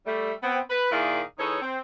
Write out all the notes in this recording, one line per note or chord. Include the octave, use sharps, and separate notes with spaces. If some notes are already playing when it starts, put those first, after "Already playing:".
G3 A3
B3 C4
B4
A#2 D#3 E4 G#4 D5 F5
E3 D#4 G#4 A4 C#5
C4